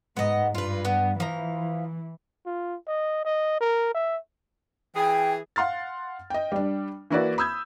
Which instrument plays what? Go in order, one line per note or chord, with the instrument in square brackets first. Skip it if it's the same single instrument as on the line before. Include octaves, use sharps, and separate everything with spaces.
[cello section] G#2 [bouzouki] B3 D#5
[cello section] G2 [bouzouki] F4 B4
[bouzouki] B3
[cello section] E3 [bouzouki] F3 A#5
[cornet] F4
D#5
D#5
A#4
E5
[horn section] E3 G#4 [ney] G5
[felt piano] F5 F#5 C6 F6 A6
D#5 G5
G3 D4
E3 A#3 E4 F#4 B4 D5
B5 D#6 E6 G6 G#6